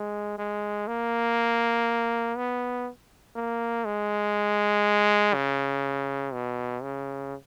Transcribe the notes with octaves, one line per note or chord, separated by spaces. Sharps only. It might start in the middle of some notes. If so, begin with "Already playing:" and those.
Already playing: G#3
G#3
A#3
B3
A#3
G#3
C#3
B2
C#3